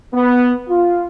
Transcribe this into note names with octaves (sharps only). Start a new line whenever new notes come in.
B3
F4